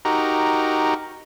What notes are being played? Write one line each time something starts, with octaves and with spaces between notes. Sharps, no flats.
D#4 F#4 G4 A#4